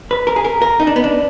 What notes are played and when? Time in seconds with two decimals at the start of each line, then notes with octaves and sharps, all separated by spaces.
0.11 B4
0.27 A#4
0.36 G#4
0.45 A#4
0.62 A#4
0.80 D#4
0.87 D4
0.96 B3
1.04 D4